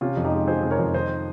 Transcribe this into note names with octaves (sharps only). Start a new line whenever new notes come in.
C3 C#4 F4
F2
D#4 G4
G#3
F3 G#4 C5
C3
A#4 C#5
F2
D#3 C5 D#5